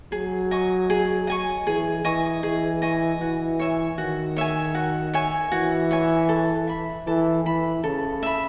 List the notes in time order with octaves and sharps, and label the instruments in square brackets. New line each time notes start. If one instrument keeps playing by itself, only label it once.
[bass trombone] F#3 [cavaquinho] G#4
[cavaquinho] D#5 G#5 C#6
G#4
D#5 G#5 C#6
[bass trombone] E3 [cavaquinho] G#4
[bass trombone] E3 [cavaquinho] D#5 G#5 C#6
[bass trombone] E3 [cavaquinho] G#4
[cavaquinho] D#5 G#5 C#6
[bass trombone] E3 [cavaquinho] F#4
[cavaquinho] C#5 E5 G#5
[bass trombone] D#3 [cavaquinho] F#4
[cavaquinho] C#5 E5 G#5
F#4
C#5 E5 G#5
[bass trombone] E3 [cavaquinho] F#4
[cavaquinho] C#5 E5 G#5
A4
E5 B5
[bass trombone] E3 [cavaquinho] A4
[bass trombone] E3 [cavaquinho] E5 B5
[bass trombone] C#3 [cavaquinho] A4
[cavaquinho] E5 B5